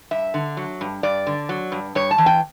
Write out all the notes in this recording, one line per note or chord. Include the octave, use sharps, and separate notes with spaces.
G2 E5
D3
F#3
G2
G2 D5
D3
F#3
G2
G2 C#5
A5
E3
G5